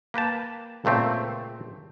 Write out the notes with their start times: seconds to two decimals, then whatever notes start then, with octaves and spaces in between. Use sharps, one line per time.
0.14 A#3 B4 G5 A5
0.85 C#2 A#2 A3 C4